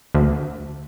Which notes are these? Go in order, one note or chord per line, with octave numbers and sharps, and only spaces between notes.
D2